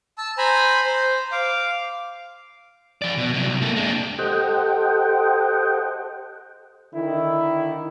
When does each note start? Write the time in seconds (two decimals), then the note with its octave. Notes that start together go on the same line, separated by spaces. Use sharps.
0.18 A5 E6
0.38 C5 G#5 A#5 B5
0.84 C5
1.32 F5 D6
3.02 F3 D5
3.17 B2
3.34 C3 F#3
3.49 C2
3.62 A#3 A4
3.76 G#3 D4
4.19 G4 A4 C5 D#5 F#5 G5
6.94 D3 D#3 E4